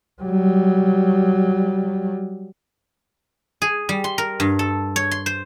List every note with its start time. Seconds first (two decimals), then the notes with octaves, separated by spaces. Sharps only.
0.22 F#3 G3
3.62 G#4
3.89 G3
4.04 C6
4.18 A#4
4.40 G2
4.59 A4
4.96 C#5
5.11 C6
5.26 C5